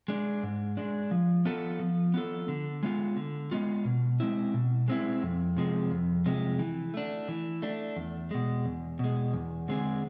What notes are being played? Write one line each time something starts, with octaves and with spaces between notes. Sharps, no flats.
G#3 D4
G#2
G#3 D4
F3
B3 F4 A4
F3
B3 F4 A4
D3
G#3 B3 F4
D3
G#3 B3 F4
B2
G#3 C4 E4
B2
G#3 C4 E4
F2
C3 F3 G#3
F2
C3 F3 G#3
E3
A3 D4
E3
A3 D4
E2
B2 G#3
E2
B2 G#3
E2
D3 G#3 C4 G#4